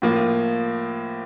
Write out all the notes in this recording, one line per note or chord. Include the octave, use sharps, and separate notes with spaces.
A2 F3 A#3